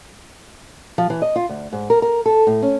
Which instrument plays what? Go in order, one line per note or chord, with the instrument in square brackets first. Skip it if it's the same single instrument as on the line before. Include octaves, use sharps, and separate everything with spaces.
[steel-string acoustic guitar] F3
E3
D#5
F4
D2
G#2
A#4
A#4
A4
A2
C#4